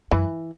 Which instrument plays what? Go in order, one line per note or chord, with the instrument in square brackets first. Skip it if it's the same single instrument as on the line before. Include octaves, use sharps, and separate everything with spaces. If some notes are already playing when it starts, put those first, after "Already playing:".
[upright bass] F#2 [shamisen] E3